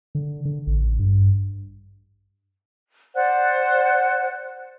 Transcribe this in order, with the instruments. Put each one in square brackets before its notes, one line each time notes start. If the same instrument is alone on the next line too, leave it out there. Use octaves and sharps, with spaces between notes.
[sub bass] D3
D3
A1
G2
[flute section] C5 D5 F#5 F#6